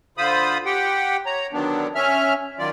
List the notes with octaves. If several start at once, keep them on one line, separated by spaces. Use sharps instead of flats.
D3 F4 C5 B5 D#6
G4 F#5 G5
C#5 A#5
D3 D#3 F#3 B3 D4
C#4 E5 F6
D#3 F#3 F4 D5